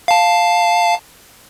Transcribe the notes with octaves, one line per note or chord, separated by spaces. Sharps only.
F5 A5